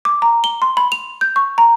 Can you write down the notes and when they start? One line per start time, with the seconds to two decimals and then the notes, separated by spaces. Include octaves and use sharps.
0.05 D6
0.22 A#5
0.44 G7
0.62 C6
0.77 B5
0.92 F7
1.21 G6
1.36 C#6
1.58 A#5